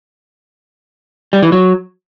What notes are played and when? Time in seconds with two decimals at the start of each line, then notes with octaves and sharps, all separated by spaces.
1.33 G3
1.43 E3
1.52 F#3